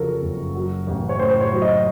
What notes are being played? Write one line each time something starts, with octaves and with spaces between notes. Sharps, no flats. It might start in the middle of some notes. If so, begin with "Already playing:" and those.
Already playing: F2 C#3 F3 F4 F#4 A4 A#4
F#1
F#3
A1
C#5
A2 C5
C5
C#5
F#3
D#5